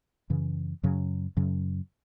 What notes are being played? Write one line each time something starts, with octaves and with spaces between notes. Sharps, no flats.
F#2 C#3 E3
F#2 C#3 F#3
F#2 C#3 F#3